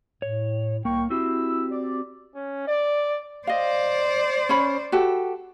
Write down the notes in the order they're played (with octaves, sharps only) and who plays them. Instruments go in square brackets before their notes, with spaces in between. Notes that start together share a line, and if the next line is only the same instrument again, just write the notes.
[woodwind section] A2 [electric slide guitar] C#5
[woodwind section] C2 G5 C#6 [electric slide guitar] A#3
[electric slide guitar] C4 F#4 G4 [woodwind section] E4 E6
[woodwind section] D5
[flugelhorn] C#4
D5
[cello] C5 D5 [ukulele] D#5 F5
[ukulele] C#4 C#5 B5
F#4 G4 A4